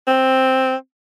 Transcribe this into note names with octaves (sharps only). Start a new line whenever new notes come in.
C4